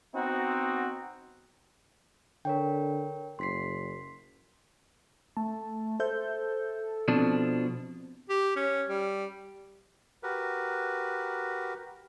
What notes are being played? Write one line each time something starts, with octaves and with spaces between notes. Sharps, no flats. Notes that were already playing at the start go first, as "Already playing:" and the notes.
B3 C4 D#4 F#4
D3 A#4 C#5 G5
F#1 C6 B6 C7
A3 A5
A4 C5 E5 G6
B2 F3 C4 D4
G4
C#4
G3
F#4 G4 A#4 B4